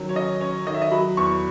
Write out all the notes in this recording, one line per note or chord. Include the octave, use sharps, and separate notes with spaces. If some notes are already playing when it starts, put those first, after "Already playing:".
Already playing: D#3 F#3 C#4
C#5
C#4 D#5
C#4 C#5
D#3 D#5
E5
D#5
F#3 B5
E2 C#6